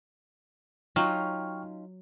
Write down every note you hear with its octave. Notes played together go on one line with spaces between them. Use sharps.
F#3 C#4 D#4 F4 G5 C#6 F6